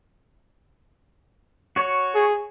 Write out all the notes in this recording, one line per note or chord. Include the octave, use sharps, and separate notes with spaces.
F#4 C#5
G#4